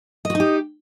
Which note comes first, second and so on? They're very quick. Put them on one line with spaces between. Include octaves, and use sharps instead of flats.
D#5 F#4 D#4 G4